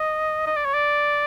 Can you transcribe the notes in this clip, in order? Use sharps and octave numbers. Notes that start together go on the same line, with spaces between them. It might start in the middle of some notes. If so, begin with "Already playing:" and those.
Already playing: D#5
D#5
D5
C#5
D5